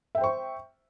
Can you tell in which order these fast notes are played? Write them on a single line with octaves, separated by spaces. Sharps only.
E5 G5 C5 C#6